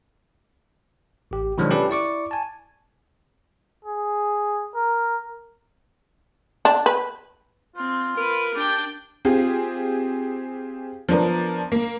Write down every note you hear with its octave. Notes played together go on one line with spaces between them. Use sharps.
A1 G4
B2 D#3 F3 F#3 G#3 D4
C#4 G4 A4 B4 D5
E4 D5 C#6 D6
G#5 A5
G#4
A#4
D4
B4
C4 F4
A#4 B4
D4 G4 G5
C4 F4 G4 G#4
F3 B3 D4 A#4
A#3